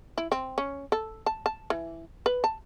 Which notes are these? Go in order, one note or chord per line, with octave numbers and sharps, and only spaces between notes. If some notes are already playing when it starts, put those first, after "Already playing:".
E4
C4
C#4
A4
A5
A5
E3
B4
A5